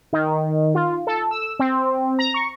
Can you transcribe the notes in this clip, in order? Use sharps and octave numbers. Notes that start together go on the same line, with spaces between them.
D#3
F4
A4
E6
C4
A#5
C#6